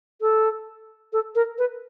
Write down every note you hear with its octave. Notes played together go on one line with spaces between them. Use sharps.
A4
A4
A#4
B4